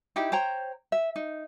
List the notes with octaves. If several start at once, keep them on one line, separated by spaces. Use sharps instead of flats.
D#4 E4 G4 G5
C5 C#5 G5 A#5
E5
D#4